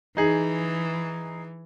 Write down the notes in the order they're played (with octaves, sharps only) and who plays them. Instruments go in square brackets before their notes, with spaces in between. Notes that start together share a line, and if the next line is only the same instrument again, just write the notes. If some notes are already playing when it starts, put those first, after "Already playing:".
[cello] E3 [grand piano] D#4 G#4